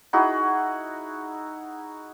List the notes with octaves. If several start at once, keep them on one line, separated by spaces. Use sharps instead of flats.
D#4 E4 F#4 G#4